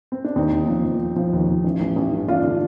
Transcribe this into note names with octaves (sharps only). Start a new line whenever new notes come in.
C4
D4
D#2 C4 D#4
D#2
F3
F3
F3
F3
D#2
D#2
A1
A1
A1
G2
A1 D4 F4
D3